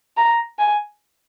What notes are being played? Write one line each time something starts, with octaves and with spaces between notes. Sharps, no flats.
A#5
G#5